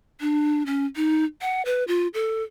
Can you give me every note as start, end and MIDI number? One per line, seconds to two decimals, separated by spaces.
0.21 0.63 62
0.66 0.86 61
0.96 1.25 63
1.42 1.62 78
1.65 1.84 71
1.88 2.08 65
2.14 2.43 69